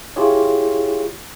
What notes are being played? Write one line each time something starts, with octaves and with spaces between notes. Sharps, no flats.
E4 F4 G4 G#4 C#5